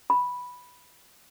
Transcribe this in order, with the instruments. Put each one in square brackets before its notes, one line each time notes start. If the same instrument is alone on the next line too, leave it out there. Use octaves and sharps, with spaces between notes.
[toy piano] B5